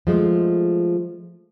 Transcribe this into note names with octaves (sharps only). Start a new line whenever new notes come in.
F3 G#3 A3